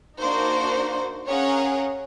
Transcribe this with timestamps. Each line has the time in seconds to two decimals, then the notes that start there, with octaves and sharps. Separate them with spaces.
0.20 A#3 D4 D#4 F#4 C5
1.29 C#4 G#4 A#4 C#5 F5 F#5